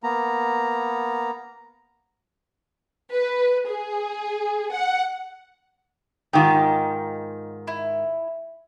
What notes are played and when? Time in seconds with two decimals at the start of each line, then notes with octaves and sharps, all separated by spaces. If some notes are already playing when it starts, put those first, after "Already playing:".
0.03 A#3 B3 A#5
3.11 B4
3.67 G#4
4.71 F#5
6.33 G#2 D#3 F4 G4 D6 D#6
7.67 E4